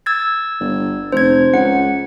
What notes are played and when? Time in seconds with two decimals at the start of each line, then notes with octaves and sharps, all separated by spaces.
0.06 E6 G#6 A6
0.60 G1
1.12 F1 C5 G#6
1.54 C#2 F#5